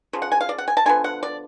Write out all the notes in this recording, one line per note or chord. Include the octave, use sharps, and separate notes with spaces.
C#3 F3
F#5
G#5
F5
D5
F#5
G#5
A5
D3 F3 B3 G#5
F#5
D5